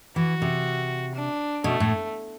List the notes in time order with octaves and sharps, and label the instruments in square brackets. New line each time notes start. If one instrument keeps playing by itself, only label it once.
[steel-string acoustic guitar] E3 [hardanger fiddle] F#4
[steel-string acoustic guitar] C3
[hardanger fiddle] D4
[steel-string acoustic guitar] B2 [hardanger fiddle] A3
[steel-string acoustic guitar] A2